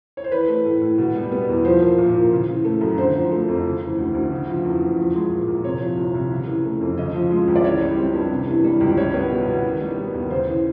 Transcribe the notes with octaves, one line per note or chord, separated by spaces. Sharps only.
C#5
C5
E3 B4
A3
A2
A2
B2
G3
B3
E2
F3 C5
A#3
A#2
A#2
C#3
E3
A3
F#2
D3 C5
F3
A3
F2
C#3
E3
D2
D2
C#3
F3
E2
E2
F3
G#3
A#2
A#2
C3 C#5
F3
C2
C2
C#3
E3
A3
F2
C#3 D#5
F3
G#3
C#2
D5
E3 C#5
G3
C4
G2
C3
E3
G3
C#2
G3 C#5
B3
B2
B2
D#3
G3
B3
D#2
C#3 C5
E3